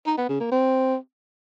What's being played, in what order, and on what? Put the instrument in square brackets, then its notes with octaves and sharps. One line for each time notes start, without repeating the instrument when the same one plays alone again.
[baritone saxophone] D#4
B3
C#3
A#3
C4